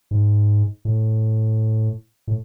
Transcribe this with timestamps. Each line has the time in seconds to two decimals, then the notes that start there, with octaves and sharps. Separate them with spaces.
0.11 G#2
0.85 A2
2.28 A2